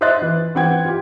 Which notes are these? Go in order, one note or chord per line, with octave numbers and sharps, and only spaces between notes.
C5 D#5 E5 C6 F#6 A6
E3
E3 C4 F#5 G5 G#6
F4 G4